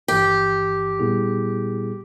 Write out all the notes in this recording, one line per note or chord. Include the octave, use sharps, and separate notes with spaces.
G1 G2 E3 G4
A#2 G3 B3 E4 G#4